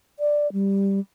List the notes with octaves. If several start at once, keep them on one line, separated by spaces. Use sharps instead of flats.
D5
G3